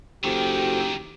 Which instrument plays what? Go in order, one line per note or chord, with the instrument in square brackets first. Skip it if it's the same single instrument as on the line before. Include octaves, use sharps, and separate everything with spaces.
[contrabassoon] F#1 [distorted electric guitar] E2 D#3 [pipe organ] F#4 A4 C5 [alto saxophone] G4